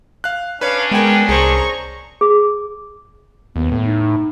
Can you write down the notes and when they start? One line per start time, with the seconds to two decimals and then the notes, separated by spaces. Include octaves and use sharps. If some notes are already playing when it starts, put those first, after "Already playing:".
0.24 F5 F#6
0.61 C#4 D4 B4 C#5 F5
0.92 G#3 B3 A#4 G5 G#5
1.29 C2 G#4 C5 A#5 C#6
2.21 G#4
3.56 D#2 B3
3.72 A2
3.85 D#4